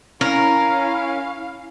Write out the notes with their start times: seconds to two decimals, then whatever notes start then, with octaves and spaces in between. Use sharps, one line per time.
0.21 C#4 E4 A#4 F5